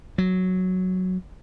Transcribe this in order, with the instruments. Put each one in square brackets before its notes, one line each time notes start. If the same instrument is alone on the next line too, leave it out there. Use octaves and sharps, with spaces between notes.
[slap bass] F#3